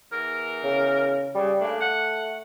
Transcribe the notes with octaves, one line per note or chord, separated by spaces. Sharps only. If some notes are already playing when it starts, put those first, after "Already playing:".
E2 A#4
C#3
C#3 G3
C#3 A3 A#3 D4
F#5